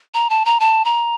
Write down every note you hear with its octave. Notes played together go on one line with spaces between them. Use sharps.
A#5
A5
A#5
A5
A#5